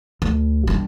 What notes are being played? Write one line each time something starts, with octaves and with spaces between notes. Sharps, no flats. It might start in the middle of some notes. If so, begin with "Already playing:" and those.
D2
G3 D4